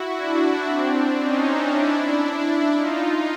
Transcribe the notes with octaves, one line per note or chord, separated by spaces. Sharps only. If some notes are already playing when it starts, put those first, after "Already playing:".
Already playing: E4 F#4
D4 E4
C4 D4
C#4 D#4
D4 E4
D#4 F4